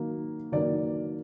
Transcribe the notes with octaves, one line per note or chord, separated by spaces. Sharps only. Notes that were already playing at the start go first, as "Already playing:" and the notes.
Already playing: D#3 F#3 A#3
D#3 F#3 A#3 D5